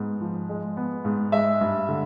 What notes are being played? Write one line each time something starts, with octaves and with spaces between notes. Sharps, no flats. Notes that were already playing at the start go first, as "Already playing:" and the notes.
Already playing: G#2 B3
F3
G#3
B3
G#2
G#3 E5
G2
D3